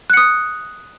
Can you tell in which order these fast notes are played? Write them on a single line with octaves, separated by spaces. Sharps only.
F#6 C#7 D#6